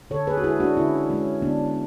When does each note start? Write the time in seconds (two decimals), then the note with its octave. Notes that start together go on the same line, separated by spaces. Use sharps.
0.10 D3 A4 C#5
0.27 G#4 B4
0.38 F#4
0.43 G#3 E4 G#4
0.60 D4 F#4
0.77 D3 C#4 E4
1.10 G#3 C#4
1.42 D3 B3 D4